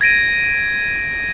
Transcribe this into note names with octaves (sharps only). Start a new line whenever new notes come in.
G#6 A#6 D7 D#7